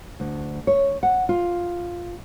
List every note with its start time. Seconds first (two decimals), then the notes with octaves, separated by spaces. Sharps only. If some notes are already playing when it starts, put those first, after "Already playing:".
0.20 D2
0.67 C#5
1.03 F#5
1.29 F4